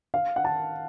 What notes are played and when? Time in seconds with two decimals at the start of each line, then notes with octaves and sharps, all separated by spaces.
0.14 F5
0.36 F#5
0.45 A5